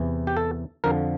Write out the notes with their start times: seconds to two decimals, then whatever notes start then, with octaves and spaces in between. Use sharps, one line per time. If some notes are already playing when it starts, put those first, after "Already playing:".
Already playing: E2 C3 E3
0.27 G4
0.37 A4
0.84 F2 D3 F3 A#4